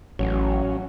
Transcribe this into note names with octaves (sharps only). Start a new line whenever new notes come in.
A1 F#3 C#4